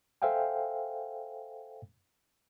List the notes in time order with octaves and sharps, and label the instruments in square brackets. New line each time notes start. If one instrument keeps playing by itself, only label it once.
[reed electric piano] A4 C5 E5 F5 G5 G#5